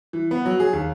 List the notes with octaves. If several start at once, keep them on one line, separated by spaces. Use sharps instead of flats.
E3
B3
F#3
G#4
D#2